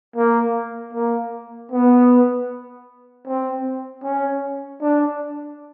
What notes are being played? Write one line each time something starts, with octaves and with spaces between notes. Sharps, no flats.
A#3
A#3
B3
C4
C#4
D4